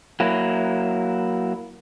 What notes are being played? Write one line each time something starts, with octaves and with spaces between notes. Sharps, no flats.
F#3 A#3 E4